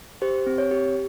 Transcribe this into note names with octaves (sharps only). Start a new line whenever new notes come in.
G4 C5
C4
C#5
G4